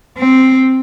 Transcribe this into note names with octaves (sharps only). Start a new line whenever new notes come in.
C4